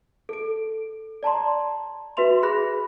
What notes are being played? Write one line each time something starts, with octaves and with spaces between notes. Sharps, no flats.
A4 D7
D5 A5 A#5 C6
F#4 B4 E5 C6 F7
G#4 B5 F#6 A#6